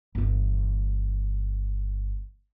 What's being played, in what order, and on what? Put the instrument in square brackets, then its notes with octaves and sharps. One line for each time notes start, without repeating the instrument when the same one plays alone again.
[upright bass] G1 E3